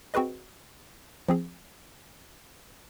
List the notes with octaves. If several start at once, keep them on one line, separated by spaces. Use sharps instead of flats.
C4 F#4 G#4 B4 D#5
F3 C4 G#4